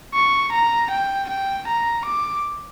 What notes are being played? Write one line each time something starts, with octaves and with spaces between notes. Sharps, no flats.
C#6
A#5
G5
G5
A#5
D6